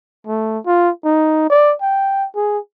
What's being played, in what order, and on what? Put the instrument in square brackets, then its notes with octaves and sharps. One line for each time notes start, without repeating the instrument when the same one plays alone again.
[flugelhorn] A3
F4
D#4
D5
G5
G#4